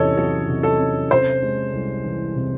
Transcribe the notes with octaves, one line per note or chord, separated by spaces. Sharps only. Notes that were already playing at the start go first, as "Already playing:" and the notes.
Already playing: E2 C3 C#4 A4 C#5 D#5
F#3 A4
C3
A4
C#4
C3 C5
G#3
C2
E3
C3